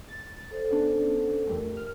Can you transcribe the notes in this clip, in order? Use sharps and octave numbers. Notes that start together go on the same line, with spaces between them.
A6
A4 C5 D5
B3 C#4 D4
F2 G3 A3 A#4
F6